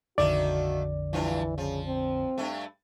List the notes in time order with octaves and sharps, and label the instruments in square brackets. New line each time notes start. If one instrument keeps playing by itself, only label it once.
[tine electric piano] A#1 F2 D3 [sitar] D#3 A3 A#3 [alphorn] F#4 [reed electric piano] D5
[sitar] G2 F3 F4 [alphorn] E3
[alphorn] C#3 [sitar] F3
[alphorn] C4
[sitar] G2 A3